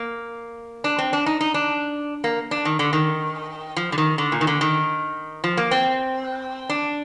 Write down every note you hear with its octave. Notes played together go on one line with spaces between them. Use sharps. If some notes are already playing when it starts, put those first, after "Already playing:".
Already playing: A#3
D4
C4
D4
D#4
D#4
D4
A#3
D4
D#3
D3
D#3
F3
D3
D#3
D3
A#2
D#3
D3
D#3
F3
A#3
C4
D4